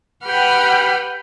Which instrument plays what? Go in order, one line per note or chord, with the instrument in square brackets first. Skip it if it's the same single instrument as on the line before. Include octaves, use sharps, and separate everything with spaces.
[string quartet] G4 B4 F#5 G5 B5 F6